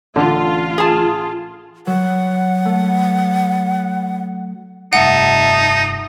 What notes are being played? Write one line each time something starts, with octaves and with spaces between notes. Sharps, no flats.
A1 D3 F4
G#4 A5
F#3 F#5
A3
F1 G2 D#4 E5 F#5 A5